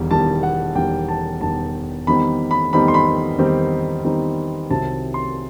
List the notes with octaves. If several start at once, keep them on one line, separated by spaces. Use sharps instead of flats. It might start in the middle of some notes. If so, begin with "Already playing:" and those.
Already playing: E1 E2 D#3 G3
E1 E2 D#3 G3 A5
F#5
E1 E2 D#3 G3 G5
A5
E1 E2 D#3 G3 A5
E2 D#3 G3 C4 D#4 B5
B5
E2 D#3 G3 C4 D#4 B5
C6
B5
E2 D#3 G3 C4 D#4
E2 D#3 G3 C4 D#4
C2 C3 D#3 F#3 C4 A5
C6